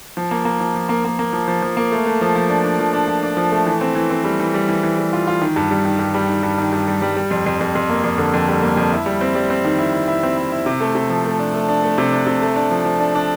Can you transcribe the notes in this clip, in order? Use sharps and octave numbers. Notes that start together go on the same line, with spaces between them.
F3
A#3
A#3
F3
F3
A#3
A#3
A#3
F3
F3
F3
A#3
A3
A3
F3
F3
D4
D4
F3
D4
F3
D4
F3
A3
E3
C4
E3
C4
G3
E3
G3
E3
E3
G3
F4
F4
D#3
G2
G3
D#3
G2
G3
D#3
G2
D#3
G2
G3
G3
G3
F2
F2
F2
F2
A#3
F2
D3
F2
G3
A#3
F2
E4
G3
C4
G3
C4
D#3
E4
E4
E4
C4
E4
E4
C3
A3
C3
F3
A3
D4
A3
D4
A3
C3
D4
C3
A3
D4
F3
F3
D4
D4